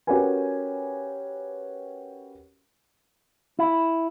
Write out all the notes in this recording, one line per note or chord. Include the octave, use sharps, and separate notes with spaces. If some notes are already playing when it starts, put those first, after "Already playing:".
C#4 F#4 G4 A#4 B4 G#5
E4